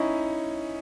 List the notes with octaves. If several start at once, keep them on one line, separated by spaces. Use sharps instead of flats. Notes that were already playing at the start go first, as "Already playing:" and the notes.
Already playing: C#4 D#4 E4